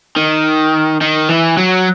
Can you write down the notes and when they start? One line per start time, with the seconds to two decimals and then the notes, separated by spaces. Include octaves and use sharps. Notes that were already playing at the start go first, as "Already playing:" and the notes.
0.17 D#3
1.01 D#3
1.29 E3
1.57 F#3